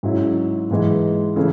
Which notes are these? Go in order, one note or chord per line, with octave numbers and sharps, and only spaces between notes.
G#2 F#3 C#4 E4 G#4
G#2 E3 G#3
C#3 E3 A3 E4 G#4